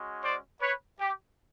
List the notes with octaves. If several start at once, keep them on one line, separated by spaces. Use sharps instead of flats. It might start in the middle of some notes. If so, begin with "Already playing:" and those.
Already playing: G#3 C#4 F#4
C5 D5
B4 C#5
G4